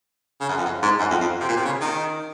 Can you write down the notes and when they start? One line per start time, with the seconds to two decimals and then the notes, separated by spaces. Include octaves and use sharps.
0.41 C#3
0.49 F#2
0.58 F2
0.66 F#2
0.83 G#2
1.00 F#2
1.11 F2
1.21 F2
1.40 C3
1.49 A#2
1.57 C3
1.65 C#3
1.81 D#3